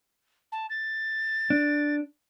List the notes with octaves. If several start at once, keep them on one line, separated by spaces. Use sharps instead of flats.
A5
A6
D4